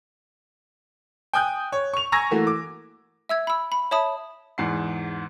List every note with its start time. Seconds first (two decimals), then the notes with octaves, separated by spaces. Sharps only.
1.34 G5 G#5 D#6 F#6 G6
1.72 C#5
1.93 C#6 F7
2.12 G#5 A#5 C#6 E6 G#6 A#6
2.31 E3 A3 A#3 F#4
2.47 D6
3.29 E5 E6 G#6
3.47 B5 E6
3.72 B5
3.91 C#5 E5 A5 B5 D#6
4.58 E2 G#2 F#5 C7